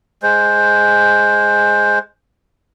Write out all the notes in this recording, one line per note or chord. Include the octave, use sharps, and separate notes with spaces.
G#3 C5